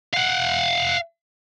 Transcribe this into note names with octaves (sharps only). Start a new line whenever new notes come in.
F5 F#5